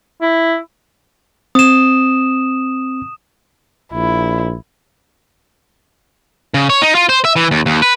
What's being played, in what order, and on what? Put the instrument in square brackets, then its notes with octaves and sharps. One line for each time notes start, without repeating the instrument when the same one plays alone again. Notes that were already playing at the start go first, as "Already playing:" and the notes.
[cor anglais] E4
[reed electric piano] C4 [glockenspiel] D#6 E7
[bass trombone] A#1 [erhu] E4
[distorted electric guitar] C#3
C#5
D#4
F4
C5
E5
E3
D#2
D#2
B4